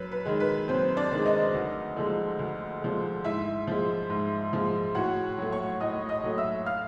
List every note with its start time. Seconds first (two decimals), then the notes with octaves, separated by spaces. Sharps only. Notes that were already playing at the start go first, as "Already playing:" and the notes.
Already playing: F#2 B4
0.12 B4
0.25 D#3 G#3
0.40 B4
0.68 F#2 C4 C5
0.97 D4 D5
1.12 D#3 G#3
1.26 D#4 D#5
1.54 D2
1.96 D3 F3 G#3
2.39 D2
2.82 D3 F3 G#3
3.24 G#2 E4 E5
3.67 F3 G#3
4.10 G#2
4.53 F3 G#3
4.95 A2 F#4 F#5
5.38 F#3 A3
5.52 C#5 C#6
5.81 A2 D#5 D#6
6.09 D#5 D#6
6.24 F#3 A3
6.38 E5 E6
6.66 F5 F6